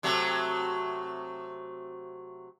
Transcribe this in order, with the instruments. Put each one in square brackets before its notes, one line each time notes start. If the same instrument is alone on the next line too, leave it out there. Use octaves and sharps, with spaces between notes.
[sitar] C3 F#3 A3